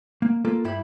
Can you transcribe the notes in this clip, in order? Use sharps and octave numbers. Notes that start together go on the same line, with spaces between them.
A#3
A#3 F4 A4
G2 G3 E4 B5